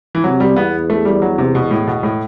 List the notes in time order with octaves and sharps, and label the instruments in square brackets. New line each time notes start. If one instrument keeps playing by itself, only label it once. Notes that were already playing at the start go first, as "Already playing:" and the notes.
[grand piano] E3
[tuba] C3 [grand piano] F#3
[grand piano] G3
[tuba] E2 [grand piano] B3
[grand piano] A3
G3
F#3
C3
B2
A2
B2
A2